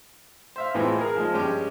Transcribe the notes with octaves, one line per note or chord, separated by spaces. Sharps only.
C5 E5 F5
A2 E3 G#3 C4 F4
G#4 A#4
F3 G#3
G2 G#3 C#4 G4